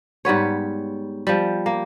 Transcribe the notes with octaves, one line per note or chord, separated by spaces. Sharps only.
G#2 G3 B3 C#5
F3 G3
A#3